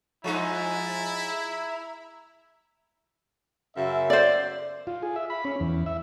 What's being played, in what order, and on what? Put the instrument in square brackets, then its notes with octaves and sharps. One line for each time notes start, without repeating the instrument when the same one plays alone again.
[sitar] F3 G#3 D#4 [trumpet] E4 [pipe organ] E5 A#5 E6
[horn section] F#2 C#3 E5
[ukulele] C5 D5
[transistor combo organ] F4
G#4
E5
B5
C#4
E2
E5